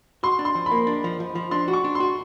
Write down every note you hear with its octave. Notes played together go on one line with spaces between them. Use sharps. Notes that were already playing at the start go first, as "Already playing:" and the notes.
F#4 C6
D4
C6
F3
B5
A#3
D4
F3
F3
F3
D4 C6
F#4
C#6
D4
C6
F#4